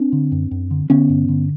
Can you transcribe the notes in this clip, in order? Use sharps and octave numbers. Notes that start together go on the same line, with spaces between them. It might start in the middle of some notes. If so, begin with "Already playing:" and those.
Already playing: C4 D4
D3
F#2
F#2
D3
D3 B3 C#4
G2
D3